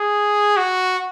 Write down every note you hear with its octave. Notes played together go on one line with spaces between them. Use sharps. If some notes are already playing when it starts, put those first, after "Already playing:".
Already playing: G#4
F#4